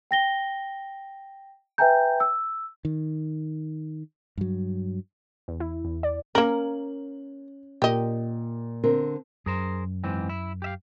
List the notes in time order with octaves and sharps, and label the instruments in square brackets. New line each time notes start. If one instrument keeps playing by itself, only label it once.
[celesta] G5 A#6 G7
B4 E5 G5 G#5 A#5 G6
E6
[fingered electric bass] D#3
G2 F#3
[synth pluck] E2
E4
E2
D5
[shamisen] A#3 A#4 [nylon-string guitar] C#4 [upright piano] F#7
[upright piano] A#2 [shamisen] G4 D#5
[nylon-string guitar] D3 C4 A#4
[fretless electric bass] F#2 [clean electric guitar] G#4 A#4 C5
[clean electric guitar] G#2 E3 C4
E4
G4 E5 F5